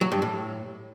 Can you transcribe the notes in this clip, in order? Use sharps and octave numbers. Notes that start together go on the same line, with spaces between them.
F#3
G2
A2